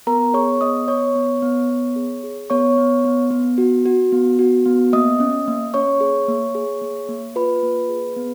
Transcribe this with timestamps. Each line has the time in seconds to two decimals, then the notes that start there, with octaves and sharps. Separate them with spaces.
0.07 B3 A#4 A#5
0.34 G#4 C#5 C#6
0.61 B3 D#5 D#6
0.88 B3 C#5 C#6
1.15 B3
1.42 B3
1.70 B3
1.96 G#4
2.23 G#4
2.50 B3 C#5 C#6
2.78 B3
3.05 B3
3.31 B3
3.58 F#4
3.86 F#4
4.12 B3
4.39 F#4
4.66 B3
4.93 A#3 D#5 D#6
5.20 C#4
5.48 A#3
5.74 C#4 C#5 C#6
6.00 G#4
6.28 A#3
6.55 G#4
6.81 A#3
7.09 A#3
7.36 F4 B4 B5
7.63 A#3
7.89 G#4
8.16 B3